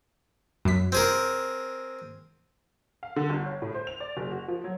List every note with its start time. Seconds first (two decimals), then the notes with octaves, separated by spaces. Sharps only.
0.65 F#2 B6
0.92 C4 G#4 A#4
3.03 F5
3.16 D3
3.30 G1
3.45 C#5
3.62 A2
3.74 C5
3.87 F7
4.00 D5
4.17 F#1
4.32 F#4
4.48 F3
4.64 F#3